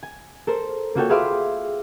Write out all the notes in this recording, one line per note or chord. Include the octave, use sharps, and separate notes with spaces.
G#5
A4 A#4 C5
A#3 F4 F#4 A4 C#5 G5
G#4 B4 E5 F5 C6 D6